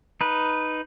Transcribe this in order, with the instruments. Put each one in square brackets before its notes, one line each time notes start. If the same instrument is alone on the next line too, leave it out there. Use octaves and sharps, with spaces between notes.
[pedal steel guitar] D#4 B4